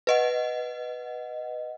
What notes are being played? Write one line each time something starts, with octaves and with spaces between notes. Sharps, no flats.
B4 D#5 F#5